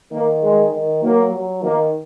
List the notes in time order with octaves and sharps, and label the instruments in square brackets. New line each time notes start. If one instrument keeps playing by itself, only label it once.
[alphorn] D#3 [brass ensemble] A#3
[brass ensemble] G#3
[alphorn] D#3
[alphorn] F#3 [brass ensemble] A#3
[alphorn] F#3
[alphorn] D#3 [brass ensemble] A#3